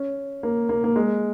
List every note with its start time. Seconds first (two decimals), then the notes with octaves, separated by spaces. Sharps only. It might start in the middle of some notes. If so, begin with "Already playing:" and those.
Already playing: C#4
0.43 A#3
0.69 A#3
0.84 A#3
0.96 G#3